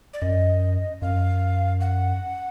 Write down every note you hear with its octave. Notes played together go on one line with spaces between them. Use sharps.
D5
F#2 D#5
F#2 F5
F#5